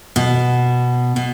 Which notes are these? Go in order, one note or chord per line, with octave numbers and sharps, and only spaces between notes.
B2
B2